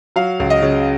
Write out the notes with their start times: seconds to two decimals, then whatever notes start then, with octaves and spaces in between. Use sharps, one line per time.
0.16 F#3 F5
0.40 C#2
0.50 D#5
0.62 C#3